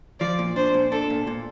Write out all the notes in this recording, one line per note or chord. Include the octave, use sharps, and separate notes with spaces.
F3 D5
A#2
D4 C5
A#2
D4 A4
A#2
A#2